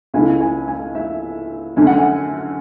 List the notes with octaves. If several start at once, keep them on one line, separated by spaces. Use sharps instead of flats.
C#2 B2 A3 C#4 E4 G#5
G#5
G#5
E5
F#2 D3 A3 C#4 G#5
F#5
G#5